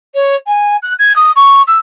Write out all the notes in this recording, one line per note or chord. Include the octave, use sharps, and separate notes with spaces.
C#5
G#5
F#6
G#6
D#6
C#6
E6